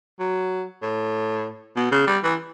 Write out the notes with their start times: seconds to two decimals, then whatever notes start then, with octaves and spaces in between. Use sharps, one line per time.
0.20 F#3
0.82 A2
1.76 B2
1.91 C#3
2.07 G3
2.24 E3